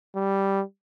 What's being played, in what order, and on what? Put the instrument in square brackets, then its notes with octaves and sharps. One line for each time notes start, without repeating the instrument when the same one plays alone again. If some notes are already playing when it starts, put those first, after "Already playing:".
[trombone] G3